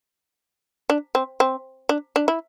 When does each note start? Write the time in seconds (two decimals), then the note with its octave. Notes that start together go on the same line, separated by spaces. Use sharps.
0.90 D4
1.15 C4
1.40 C4
1.89 D4
2.16 D4
2.28 E4